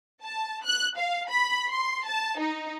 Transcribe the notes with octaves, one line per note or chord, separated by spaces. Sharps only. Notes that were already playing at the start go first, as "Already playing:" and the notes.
A5
F#6
F5
B5
C6
A5
D#4